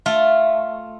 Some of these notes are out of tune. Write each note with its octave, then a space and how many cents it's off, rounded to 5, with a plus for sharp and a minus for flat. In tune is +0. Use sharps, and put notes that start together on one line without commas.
A3 +0 F4 +0